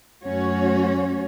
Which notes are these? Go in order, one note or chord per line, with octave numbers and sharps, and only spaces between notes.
F#2 A3 C#4 F#4 C#5